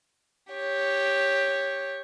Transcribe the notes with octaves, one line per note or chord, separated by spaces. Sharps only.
G4 C#5